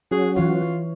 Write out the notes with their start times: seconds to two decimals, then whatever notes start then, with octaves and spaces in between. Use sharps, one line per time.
0.11 F#3 C#4 F#4 G#4
0.36 E3 F4 C#5